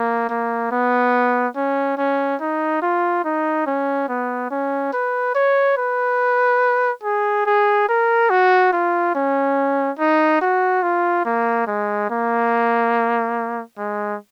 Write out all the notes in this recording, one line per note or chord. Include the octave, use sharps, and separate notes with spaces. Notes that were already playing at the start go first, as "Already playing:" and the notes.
Already playing: A#3
A#3
B3
C#4
C#4
D#4
F4
D#4
C#4
B3
C#4
B4
C#5
B4
G#4
G#4
A#4
F#4
F4
C#4
D#4
F#4
F4
A#3
G#3
A#3
G#3